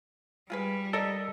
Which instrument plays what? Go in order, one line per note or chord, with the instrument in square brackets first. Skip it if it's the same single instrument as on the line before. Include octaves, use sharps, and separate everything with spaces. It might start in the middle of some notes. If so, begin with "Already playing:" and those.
[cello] G3 [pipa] F4 G#4 B4
[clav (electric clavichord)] A4 [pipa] A#4 D5 D#5